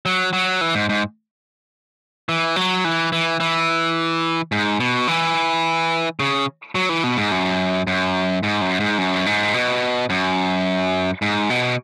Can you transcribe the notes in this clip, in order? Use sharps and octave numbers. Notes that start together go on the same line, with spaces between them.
F#3
F#3
E3
G#2
G#2
E3
F#3
E3
E3
E3
G#2
B2
E3
C#3
F#3
E3
B2
G#2
F#2
F#2
G#2
F#2
G#2
F#2
G#2
B2
F#2
G#2
B2